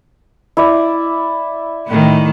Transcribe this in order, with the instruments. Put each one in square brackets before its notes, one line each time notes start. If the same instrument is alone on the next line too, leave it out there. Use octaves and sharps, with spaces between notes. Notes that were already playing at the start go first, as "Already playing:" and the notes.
[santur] E4 D5
[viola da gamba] A2 D#3